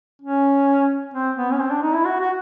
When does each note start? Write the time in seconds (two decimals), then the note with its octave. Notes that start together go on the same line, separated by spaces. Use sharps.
0.22 C#4
1.14 C4
1.36 B3
1.52 C#4
1.59 C4
1.71 D4
1.82 D#4
1.93 E4
2.04 F#4
2.20 F#4